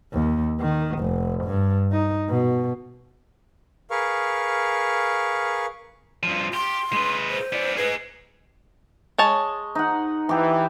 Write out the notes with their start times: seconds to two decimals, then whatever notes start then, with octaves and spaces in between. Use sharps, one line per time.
0.13 D#2
0.60 D#3
0.99 F1
1.44 G2
1.92 D#4
2.29 B2
3.91 G#4 A#4 B4 F5 C#6
6.23 G2 F3
6.54 G4 C6
6.93 G#3 B4
7.29 C5
7.53 B3 D5
7.77 D#4 G#4 B4
9.18 G#3 C#5 A5
9.75 D#4 F#5
10.29 E3 G4 D6